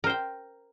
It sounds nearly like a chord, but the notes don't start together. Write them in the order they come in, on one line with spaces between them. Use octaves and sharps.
A#4 C5 G5